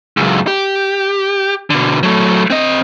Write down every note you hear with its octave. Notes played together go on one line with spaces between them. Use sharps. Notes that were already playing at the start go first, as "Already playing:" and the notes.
C#2 F#2
G4
B2 D3
F#3 A3
C4 D#5